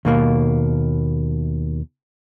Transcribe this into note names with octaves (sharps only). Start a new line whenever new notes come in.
D#2 B2 A#3